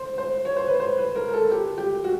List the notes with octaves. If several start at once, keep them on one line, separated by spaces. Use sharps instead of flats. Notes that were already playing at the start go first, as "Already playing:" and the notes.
Already playing: C5
C5
C#5
C5
B4
C5
B4
A#4
A#4
A4
G4
G4
F#4